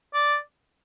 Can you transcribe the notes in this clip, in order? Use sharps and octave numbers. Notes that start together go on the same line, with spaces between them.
D5